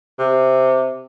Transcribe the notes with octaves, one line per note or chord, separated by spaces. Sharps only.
C3